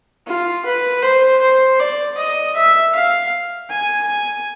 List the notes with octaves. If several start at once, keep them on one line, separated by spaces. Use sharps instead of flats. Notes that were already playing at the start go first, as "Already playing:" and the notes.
F4
B4
C5
C5
D5
D#5
E5
F5
G#5